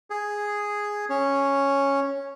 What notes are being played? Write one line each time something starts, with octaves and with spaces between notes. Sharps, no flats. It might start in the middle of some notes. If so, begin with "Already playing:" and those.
G#4
C#4